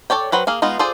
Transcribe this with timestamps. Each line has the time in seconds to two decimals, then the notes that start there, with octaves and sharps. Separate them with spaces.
0.10 A4 C#5 D5 G5
0.32 F#3 B4 C5 G5
0.47 A#3 G#4 F5
0.62 G#3 B3 D#4 F4
0.79 F4 G#4 A4 C5 D5